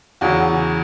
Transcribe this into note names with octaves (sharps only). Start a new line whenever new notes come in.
E2 C#3 E3 F#4